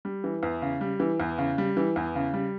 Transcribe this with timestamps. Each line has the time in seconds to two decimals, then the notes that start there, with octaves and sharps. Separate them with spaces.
0.05 G3
0.24 E3
0.43 E2
0.62 C#3
0.81 G3
1.00 E3
1.20 E2
1.38 C#3
1.58 G3
1.77 E3
1.96 E2
2.16 C#3
2.34 G3